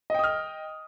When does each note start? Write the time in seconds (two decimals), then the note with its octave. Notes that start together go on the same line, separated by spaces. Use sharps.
0.10 D#5
0.14 G5
0.19 D#6
0.24 F6